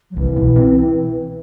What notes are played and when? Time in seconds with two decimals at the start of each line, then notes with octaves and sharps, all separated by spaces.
0.10 F#3
0.16 C2 E3
0.36 B2
0.56 C4